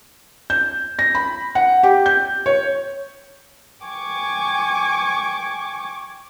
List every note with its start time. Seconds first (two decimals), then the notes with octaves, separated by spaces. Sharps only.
0.50 G6
0.99 A#6
1.15 B5
1.55 F#5
1.83 G4
2.06 G6
2.46 C#5
3.84 G5 G#5 C#6 D6 G#6